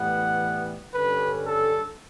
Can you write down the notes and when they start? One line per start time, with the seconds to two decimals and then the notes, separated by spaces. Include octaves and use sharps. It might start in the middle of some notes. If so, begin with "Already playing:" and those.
Already playing: A2 E3 G3 B3 F#5
0.94 G2 D3 G3 C#4 B4
1.46 A4